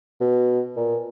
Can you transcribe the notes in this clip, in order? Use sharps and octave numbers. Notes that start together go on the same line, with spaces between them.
B2
A#2